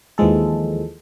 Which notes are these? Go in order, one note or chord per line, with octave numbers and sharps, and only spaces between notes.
D#2 E3 F3 G#3 A4